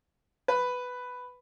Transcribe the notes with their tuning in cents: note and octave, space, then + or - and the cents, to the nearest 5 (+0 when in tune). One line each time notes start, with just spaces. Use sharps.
B4 +5